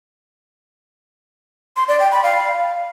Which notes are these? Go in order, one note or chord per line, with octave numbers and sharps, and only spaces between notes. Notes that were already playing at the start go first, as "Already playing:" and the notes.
C6
D5
G5
B5
F5